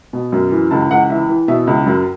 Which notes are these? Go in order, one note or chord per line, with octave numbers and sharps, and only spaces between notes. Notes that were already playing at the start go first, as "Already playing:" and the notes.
B2
F#2
E3
C#2 A5
C#2 F#5
E3 E5
E3
B2 E5
C#2
F#2